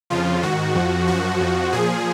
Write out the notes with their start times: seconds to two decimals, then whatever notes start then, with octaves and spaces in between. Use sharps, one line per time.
0.10 F2 C#3 F3 F4
0.43 G#2 D#3 F#4
0.75 F2 F3
1.07 F#2 F3 F#4
1.40 F2 F3
1.72 A#2 F3 G#4